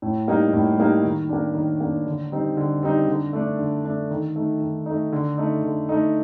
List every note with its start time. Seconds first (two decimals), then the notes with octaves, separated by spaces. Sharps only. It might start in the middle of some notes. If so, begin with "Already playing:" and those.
0.02 A2
0.28 G3 A#3 D#4
0.53 A2
0.78 G3 A#3 D#4
1.04 D#3
1.29 A#3 D4
1.55 D#3
1.81 A#3 D4
2.06 D3
2.32 G3 C4 D#4
2.57 D3
2.83 G3 C4 D#4
3.08 D3
3.33 A3 D4
3.59 D3
3.85 A3 D4
4.10 D#3
4.36 A3 D#4
4.61 D#3
4.86 A3 D#4
5.12 D3
5.38 A3 D#4
5.63 D3
5.89 A3 D#4